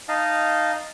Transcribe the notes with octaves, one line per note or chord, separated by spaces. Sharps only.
D#4 D#5 F5 A5